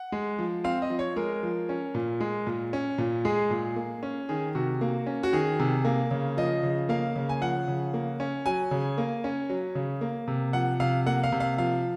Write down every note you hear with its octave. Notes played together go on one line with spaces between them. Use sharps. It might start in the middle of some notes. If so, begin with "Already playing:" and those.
Already playing: F#5
G#3
F3
C4 F5
D#5
F3
C#5
G#3 A#4
F3
C#4
A#2
G#3
A#2
C#4
A#2
G#3 G#4
A#2
A#3
C#4
D#3 G#4
C3 F#4
A#3
C#4
F#4
D#3 G#4
C3
A#3
C#3
F3 D#5
C#3
A#3 F5
C#3
G#5
F3 F#5
C#3
A#3
C#4
F#3 G#5
C#3
A#3
C#4
F#3
C#3
A#3
C3
F3 F#5
C3 F5
A#3 F#5
F5
C3
F5
F3 F5